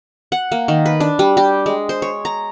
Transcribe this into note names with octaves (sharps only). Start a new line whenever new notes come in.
F#5
A#3
D#3
B4
D4
G3
G4
G#3
C5
C#5
A#5